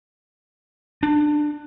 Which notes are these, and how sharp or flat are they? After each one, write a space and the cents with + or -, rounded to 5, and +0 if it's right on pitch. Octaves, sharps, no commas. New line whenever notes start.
D4 +20